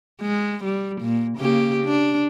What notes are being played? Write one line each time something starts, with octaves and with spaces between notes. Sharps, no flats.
G#3
G3
A#2
C#3 A#3 G4
D4